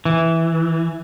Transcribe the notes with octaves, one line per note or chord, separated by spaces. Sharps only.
E3